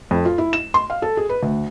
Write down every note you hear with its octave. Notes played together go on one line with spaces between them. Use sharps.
F2
F4
E4
E7
C6
F5
A4
G#4
B4
D2